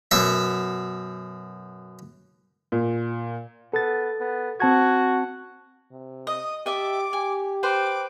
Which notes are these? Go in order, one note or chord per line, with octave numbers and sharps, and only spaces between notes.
F#2 B2 E5
A#2
B3 A4 A6
B3
C4 F#4 A5 G#6
C3
D#5 D#6
G4 D#5 E5 A5 D6
G4 G#5
B4 C5 G5 D6